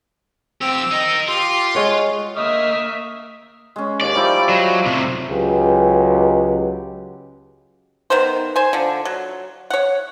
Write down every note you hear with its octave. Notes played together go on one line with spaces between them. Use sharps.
F2 C4 G4 E6
D#4 A#4 D#5
F4 G4 C6
G#3 C#5 F#5
A#3 D#5 E5 C#6 D#6 F6
G#3 C#4
D#2 D5
F3 G3 D#4 E4
F#3
A2 C3
C#2 F#3 G#3 G4 B4
D#3 B3 A#4 C5
C5 G#5
D3 F3
F#3
C#5 F#5